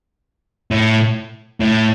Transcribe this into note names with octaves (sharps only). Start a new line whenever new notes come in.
A2
A2